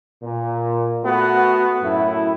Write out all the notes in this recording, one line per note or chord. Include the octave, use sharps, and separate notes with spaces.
A#2
A3 B3 F#4
F#2 A2 E4